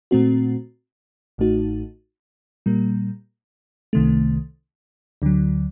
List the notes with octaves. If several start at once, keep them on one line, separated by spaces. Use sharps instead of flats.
A#2 A3 C4 F#4
A1 A2 A3 D#4 F#4
A#2 G3 A#3
C2 C3 D#3 A3
D2 D3 F#3